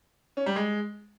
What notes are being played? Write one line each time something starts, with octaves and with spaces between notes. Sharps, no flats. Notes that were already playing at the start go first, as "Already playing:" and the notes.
C#4
G3
G#3